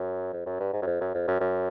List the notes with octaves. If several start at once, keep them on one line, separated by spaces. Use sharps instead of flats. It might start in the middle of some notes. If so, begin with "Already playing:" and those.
Already playing: F#2
F2
F#2
G2
G#2
F#2
F2
F#2
F2
F#2
F#2